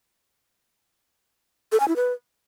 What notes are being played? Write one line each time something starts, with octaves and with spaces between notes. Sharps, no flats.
A4
G#5
E4
B4